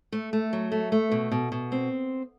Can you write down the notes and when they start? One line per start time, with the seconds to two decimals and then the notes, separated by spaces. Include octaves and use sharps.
0.12 A3
0.33 A3
0.53 F#3
0.72 A3
0.92 A3
1.11 B2
1.32 B2
1.52 B2
1.72 C4